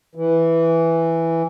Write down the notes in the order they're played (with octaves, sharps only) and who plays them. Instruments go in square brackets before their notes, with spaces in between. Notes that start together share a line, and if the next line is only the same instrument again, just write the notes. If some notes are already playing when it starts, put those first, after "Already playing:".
[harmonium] E3